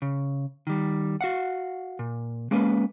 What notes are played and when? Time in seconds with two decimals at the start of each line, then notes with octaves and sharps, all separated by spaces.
0.02 C#3
0.67 D#3 G3
1.21 F#4 F5 F#5
1.99 A#2
2.51 G#3 A#3 C#4 B4